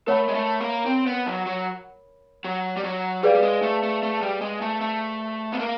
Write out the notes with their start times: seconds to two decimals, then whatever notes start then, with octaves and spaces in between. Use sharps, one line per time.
0.07 A3 A#4 C#5 F#5 B5
0.29 G#3
0.34 A3
0.61 A#3
0.86 C4
1.07 B3
1.26 F#3
1.46 F#3
2.45 F#3
2.77 G3
2.84 F#3
3.23 G3 G#4 B4 D5 F5
3.35 G3
3.42 G#3
3.62 A3
3.83 A3
4.03 A3
4.22 G3
4.41 G#3
4.61 A3
4.81 A3
5.52 B3
5.60 A#3